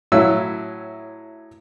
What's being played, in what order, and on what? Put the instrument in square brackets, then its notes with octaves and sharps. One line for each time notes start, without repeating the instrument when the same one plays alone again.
[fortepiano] A2 F#3 E4 E6